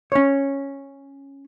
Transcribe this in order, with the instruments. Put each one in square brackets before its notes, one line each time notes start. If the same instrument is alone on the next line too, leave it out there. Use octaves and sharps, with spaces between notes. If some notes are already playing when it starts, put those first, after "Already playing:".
[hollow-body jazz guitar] C#4 C#5